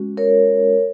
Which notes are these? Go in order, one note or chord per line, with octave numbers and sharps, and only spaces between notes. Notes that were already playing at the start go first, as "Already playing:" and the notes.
Already playing: G#3 C#4 F#4
A#4 C#5